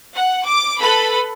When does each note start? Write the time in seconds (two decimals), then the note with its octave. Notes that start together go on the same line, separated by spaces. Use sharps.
0.15 F#5
0.46 D6
0.80 A4 B4 B5